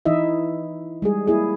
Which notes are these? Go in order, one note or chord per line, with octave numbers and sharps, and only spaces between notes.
E3 D#4 E4 D#5 E5
G3 G#3 G#4
A#3 E4 G#4